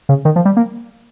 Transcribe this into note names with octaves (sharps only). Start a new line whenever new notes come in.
C#3
D#3
F3
G3
A#3